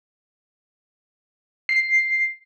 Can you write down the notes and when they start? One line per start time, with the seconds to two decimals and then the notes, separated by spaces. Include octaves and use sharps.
1.69 C7